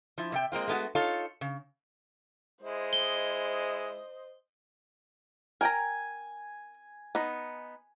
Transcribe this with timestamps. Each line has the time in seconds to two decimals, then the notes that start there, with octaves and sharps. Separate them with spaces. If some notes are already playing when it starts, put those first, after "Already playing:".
0.18 F3 E4
0.32 C3 E5 G5
0.52 G#3 A#3 C4 F4
0.68 G#3 A3 B3 E4 F#4
0.95 D#4 F4 A4 C#5
1.41 C#3
2.63 G#3 E4 C5 D#5
2.93 G7
5.61 A#4 G5 G#5 A#5
7.15 B3 D#4